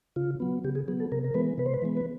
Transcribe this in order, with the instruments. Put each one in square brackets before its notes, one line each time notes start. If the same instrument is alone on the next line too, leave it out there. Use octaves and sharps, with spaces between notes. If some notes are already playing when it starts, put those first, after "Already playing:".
[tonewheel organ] C#3 F4
F#3 B3
C#3 G4
G#4
F#3 B3 G#4
A4
C3 A#4
A#4
E3 G#3 B3 B4
C3 B4
C5
B4
E3 G#3 B3
B4